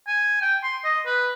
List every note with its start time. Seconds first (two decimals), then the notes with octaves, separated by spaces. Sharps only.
0.07 G#5
0.42 G5
0.63 C6
0.84 D#5
1.06 B4